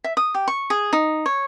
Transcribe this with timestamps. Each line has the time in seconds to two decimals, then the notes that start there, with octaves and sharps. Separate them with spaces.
0.04 E5
0.17 D#6
0.34 G4
0.48 C#6
0.70 G#4
0.93 D#4
1.26 C#5